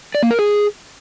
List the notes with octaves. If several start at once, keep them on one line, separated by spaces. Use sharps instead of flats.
D5
A#3
A#4
G#4